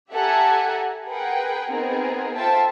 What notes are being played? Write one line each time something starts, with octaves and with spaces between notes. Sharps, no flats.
G4 A4 E5 F#5 G#5 A#5
G#4 A#4 B4 F#5 G5
B3 C4 D#4 G#4 A#4
F4 A4 C5 E5 G5 A5